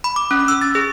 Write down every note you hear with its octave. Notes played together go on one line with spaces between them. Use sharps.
B5
D6
C#4
E6
A6
G#4